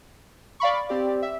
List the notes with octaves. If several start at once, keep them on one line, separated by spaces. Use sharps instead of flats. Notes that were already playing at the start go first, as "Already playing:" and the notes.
D5 F5 B5 C#6
C4 G4 D5
E5